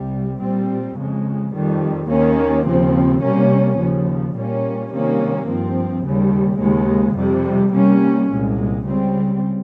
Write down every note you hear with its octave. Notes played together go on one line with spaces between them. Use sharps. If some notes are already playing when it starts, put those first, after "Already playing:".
Already playing: C2 C3 G3
A#2 G3 C4
F2 C#3 G#3
F2 D#3 G3
D#2 D#3 A#3 C#4
D#2 C#3 F3 C4
C3 G3 A#3 C#4
D#2 C#3 F3
A#2 G3 A#3 C#4
C3 D#3 G3 A#3 C#4
G2 F3 C4
D#2 C#3 G3
D#2 C#3 G#3
F2 C3 G3
C3 G3 A#3 C#4
C2 A#2 G#3
C#2 C#3 G3 C4